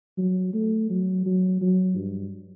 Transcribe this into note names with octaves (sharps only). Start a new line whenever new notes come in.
F#3
A3
F#3
F#3
F#3
G2